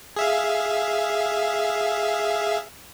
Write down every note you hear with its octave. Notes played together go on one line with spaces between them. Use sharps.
G#4 E5 F5